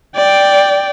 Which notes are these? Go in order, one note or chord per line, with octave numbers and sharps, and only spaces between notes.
D5 G5